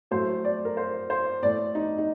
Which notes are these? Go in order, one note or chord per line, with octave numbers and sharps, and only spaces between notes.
A2 F#3 A3 C5
D5
A#4
C5
C5
A2 A3 D5
D#4
D#4